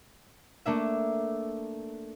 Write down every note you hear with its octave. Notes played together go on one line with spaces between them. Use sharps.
A3 A#3 D4 E5